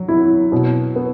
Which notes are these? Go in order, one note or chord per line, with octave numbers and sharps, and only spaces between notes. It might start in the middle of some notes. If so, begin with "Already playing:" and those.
Already playing: F#3
E4
B2
B3